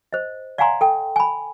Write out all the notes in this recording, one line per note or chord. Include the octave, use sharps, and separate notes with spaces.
C5 D#5
D5 F5 F#5 G#5 A#5 C6
A4 G5
G#5 B5